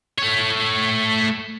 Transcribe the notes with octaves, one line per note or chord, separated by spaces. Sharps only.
A3 C#5